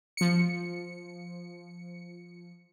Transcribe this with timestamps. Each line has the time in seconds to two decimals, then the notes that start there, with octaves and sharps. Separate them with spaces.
0.17 F3 C#7